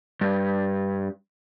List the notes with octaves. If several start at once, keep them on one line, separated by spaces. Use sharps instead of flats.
G2